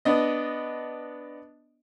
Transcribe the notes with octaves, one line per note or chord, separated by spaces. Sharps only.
B3 D4 D#5